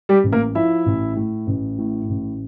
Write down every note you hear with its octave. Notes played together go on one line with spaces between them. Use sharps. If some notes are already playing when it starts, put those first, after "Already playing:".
G3 G4
A1
A#3 A#4
F3 E4 E5
A1
A2
A1
A2
A1